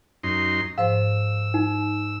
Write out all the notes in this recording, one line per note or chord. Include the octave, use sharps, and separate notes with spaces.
F#2 D#4 C6
G#2 F3 C5 F5 E6
D#4